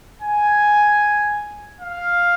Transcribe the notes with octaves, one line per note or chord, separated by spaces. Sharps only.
G#5
F5